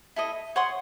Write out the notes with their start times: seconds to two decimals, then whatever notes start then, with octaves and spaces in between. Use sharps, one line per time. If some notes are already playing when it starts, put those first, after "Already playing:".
0.16 E4 A4 D#5
0.56 C#5 F#5 C6 D#6